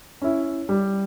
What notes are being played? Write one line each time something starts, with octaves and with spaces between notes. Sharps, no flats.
C#4 E4
G3